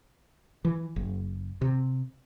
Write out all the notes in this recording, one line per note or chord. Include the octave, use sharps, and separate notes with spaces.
E3
F#1
C3